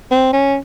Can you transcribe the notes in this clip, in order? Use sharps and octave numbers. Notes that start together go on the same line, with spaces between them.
C4
C#4